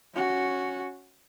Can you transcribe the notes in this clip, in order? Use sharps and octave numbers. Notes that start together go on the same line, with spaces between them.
C#4 F#4